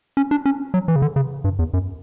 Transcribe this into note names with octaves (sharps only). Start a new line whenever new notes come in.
C#4
D4
C#4
F#3
E3
C#3
D3
C#3
G2
E2
F#2